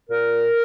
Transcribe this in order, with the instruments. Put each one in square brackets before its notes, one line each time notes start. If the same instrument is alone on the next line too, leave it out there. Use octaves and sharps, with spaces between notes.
[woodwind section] A#2 A#4